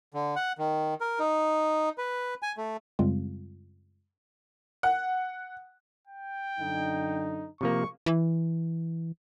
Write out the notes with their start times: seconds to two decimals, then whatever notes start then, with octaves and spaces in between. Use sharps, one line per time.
0.14 D3
0.36 F#5
0.58 D#3
1.01 A#4
1.19 D#4
1.98 B4
2.43 G#5
2.57 A3
2.99 F#2 C#3 G3 G#3 C4 F4
4.83 F#5
6.08 G5
6.59 F#2 D3 D#4
7.61 C3 F3 A#3 C#6
8.06 E3